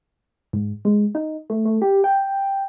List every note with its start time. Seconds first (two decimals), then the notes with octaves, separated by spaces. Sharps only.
0.53 G#2
0.85 G#3
1.15 D#4
1.50 A3
1.66 A3
1.82 G4
2.04 G5